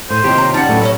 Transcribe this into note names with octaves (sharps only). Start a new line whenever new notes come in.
A2 C5 D#7
D#2 C3 F3 G4 C#5 D#5
A#5
G3 C#4 D#4 F#5 A5
A2 F#3 A3 E4 B4
C#4 F#4 E5